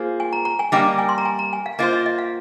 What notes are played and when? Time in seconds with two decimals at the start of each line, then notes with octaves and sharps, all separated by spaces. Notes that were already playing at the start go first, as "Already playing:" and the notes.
Already playing: A#3 F4 G#4 C5
0.20 G#5
0.33 A#5
0.45 A#5
0.59 G#5
0.72 G3 A#3 D#4 G5
0.99 G#5
1.09 C6
1.18 A#5
1.25 G#5
1.39 A#5
1.53 G#5
1.66 F5
1.79 A#3 F4 C5 D#5
1.93 D#5
2.06 D#5
2.18 F5